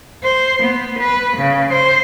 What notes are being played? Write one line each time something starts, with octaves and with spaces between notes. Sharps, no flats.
C5
B3
B4
C#3
C5